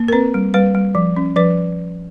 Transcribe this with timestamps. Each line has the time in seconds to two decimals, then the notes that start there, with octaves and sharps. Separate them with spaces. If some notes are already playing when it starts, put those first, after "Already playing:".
Already playing: A#3
0.08 A#4
0.12 C4 B4
0.34 G3
0.54 G3 B4
0.75 G3
0.95 F3
1.16 C#4
1.36 F3 B4